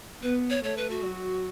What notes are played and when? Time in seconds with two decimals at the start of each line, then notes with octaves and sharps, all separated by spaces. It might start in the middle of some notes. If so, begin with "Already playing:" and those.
0.22 B3 B4
0.50 C#5
0.64 A3 C#5
0.77 B4
0.90 F#4
1.04 F#3